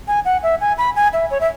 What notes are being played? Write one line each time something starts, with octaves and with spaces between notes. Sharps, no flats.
G#5
F#5
E5
G#5
B5
G#5
E5
C#5
E5